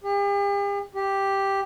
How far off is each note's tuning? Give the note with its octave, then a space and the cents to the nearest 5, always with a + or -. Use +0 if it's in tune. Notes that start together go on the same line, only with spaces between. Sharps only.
G4 +45
G4 +0